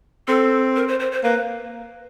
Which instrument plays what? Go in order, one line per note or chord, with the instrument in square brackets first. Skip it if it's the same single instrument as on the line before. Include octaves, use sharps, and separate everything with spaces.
[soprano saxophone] C4 [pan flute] A4
[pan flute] A#4
C5
C5
C5
[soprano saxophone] A#3 [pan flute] B4